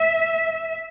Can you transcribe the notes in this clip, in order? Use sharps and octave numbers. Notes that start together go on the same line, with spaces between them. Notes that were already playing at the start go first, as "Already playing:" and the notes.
Already playing: E5